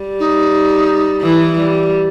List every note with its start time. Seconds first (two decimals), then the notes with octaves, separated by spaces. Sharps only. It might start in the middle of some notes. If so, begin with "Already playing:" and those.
Already playing: G3
0.20 D#4
1.22 E3
1.56 G3